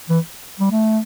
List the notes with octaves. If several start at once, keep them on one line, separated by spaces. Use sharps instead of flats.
E3
G3
A3